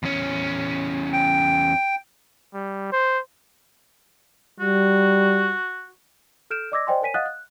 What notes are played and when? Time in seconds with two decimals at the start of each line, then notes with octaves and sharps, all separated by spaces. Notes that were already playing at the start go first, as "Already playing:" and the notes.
0.03 E2 C#4
1.13 G5
2.54 G3
2.92 C5
4.60 G3 F#4
6.50 A4 F6 G6 D7 E7
6.72 D5 D#5 D6 E6 G#6 A#6
6.87 C5 D5 D#5 G5 G#5 C6
7.01 A#4 C#5 G#5 B6 D#7
7.14 D#5 F5 F#5 D#6 F#6 A6
7.26 F#6